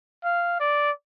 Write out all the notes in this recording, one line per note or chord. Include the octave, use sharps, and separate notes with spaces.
F5
D5